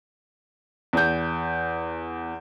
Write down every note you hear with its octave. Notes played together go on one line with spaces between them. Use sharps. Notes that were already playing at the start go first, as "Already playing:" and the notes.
E2 G6